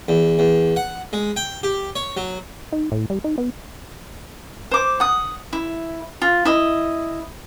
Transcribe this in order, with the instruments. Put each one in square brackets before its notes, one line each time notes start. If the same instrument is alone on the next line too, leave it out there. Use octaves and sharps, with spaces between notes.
[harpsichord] E2
E2
F#5
G#3
G5
G4
C#5
F#3
[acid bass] D#4
A2
G3
D#4
B3
[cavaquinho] C5 D6
F#5 D#6
E4
F4
E4 D#5